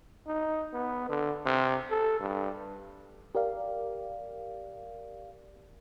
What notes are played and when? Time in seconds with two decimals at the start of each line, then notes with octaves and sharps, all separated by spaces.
0.27 D#4
0.74 B3
1.09 D3
1.46 C3
1.90 A4
2.20 G2
3.35 G4 A#4 D5 F5